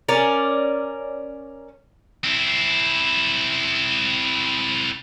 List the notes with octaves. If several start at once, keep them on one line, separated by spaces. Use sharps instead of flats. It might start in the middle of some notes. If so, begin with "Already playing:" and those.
C#4 A#4 D5
C4 E4